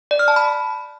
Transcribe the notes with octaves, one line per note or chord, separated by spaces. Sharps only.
D5
F6
A5
B5